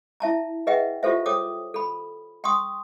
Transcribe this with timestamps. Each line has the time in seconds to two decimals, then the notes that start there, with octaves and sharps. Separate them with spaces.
0.20 E4 E5 A5 A#5
0.67 G#4 B4 D#5 E5 F#5 G5
1.03 F4 G4 A4 C5 E5
1.26 A4 C#5 G5 D6 D#6
1.74 A4 B5
2.44 G5 C6 C#6 D#6